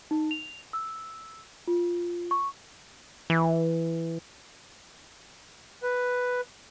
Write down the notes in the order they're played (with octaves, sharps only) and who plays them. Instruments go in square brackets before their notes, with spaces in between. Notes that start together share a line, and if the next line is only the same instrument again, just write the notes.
[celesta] D#4
F7
E6
F4
C#6
[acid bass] E3
[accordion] B4